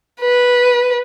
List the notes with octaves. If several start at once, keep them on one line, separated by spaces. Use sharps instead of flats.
B4